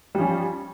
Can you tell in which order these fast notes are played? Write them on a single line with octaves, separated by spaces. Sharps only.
G3 F3 C#4